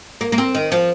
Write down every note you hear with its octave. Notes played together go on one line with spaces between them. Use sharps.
A#3
A#3
C4
D#3
F3